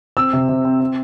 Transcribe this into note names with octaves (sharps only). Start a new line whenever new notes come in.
C4 E6
C3
C3
C4
C4